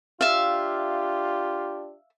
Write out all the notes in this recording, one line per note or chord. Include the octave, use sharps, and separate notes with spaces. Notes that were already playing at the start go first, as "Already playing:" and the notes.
D4 F4 G4 E5 F5